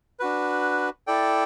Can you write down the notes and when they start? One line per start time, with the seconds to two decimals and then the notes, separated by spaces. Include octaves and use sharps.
0.20 D4 F#4 B4
1.07 E4 A4 D5 G5